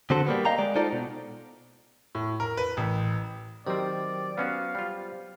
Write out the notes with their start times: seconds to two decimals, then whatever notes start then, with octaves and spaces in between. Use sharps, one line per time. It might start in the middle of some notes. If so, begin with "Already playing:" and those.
0.10 D3 C4 F#4 A4 C5
0.26 G3 A#3 B3
0.45 D#5 F5 G5 A#5
0.58 G#3 D5
0.75 D#4 F4 A4 C5 D5
0.92 B2
2.15 A2
2.40 A#4
2.57 B4
2.77 A1
3.67 D#3 F#3 C4 G4 C5 D5
4.38 B3 C#4 F#4 F5
4.75 G3 F4